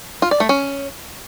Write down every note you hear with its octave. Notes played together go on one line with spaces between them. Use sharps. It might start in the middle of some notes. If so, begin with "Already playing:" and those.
F4
D5
A3
C#4